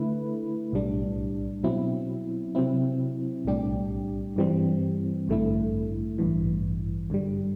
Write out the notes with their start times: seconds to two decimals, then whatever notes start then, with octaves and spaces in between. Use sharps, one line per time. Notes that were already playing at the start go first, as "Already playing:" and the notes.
Already playing: D3 A3 E4 B4
0.72 B1 A2 G3 D4
1.63 B2 F#3 C4 E4
2.55 C3 F#3 C4 E4
3.45 B1 A2 G3 D4 G4
4.36 G2 E3 G3 C4
5.28 A1 G2 D3 A3 E4
6.18 A1 G2 E3
7.10 G2 D3 G3